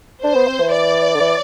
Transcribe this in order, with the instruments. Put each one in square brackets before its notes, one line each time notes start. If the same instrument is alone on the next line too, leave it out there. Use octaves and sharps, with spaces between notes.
[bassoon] D4 [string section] C5
[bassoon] B3
C4
E3
[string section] D5
[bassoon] D3
E3